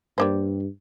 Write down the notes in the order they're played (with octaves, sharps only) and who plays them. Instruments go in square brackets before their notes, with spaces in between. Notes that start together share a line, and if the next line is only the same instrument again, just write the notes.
[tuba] G2 [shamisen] G3 A#3 C5